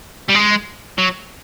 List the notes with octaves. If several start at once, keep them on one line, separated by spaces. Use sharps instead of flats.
G3
G#3
F#3